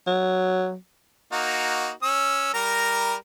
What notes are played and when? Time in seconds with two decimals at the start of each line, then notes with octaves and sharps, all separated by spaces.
0.07 F#3
1.33 A#3 D#4 F#4
2.03 C#4 E6
2.54 G3 A#4 A#5